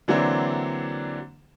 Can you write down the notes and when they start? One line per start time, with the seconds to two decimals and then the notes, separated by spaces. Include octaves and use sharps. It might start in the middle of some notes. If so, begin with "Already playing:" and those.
0.08 D3 E3 F#3 A#3 C4 D4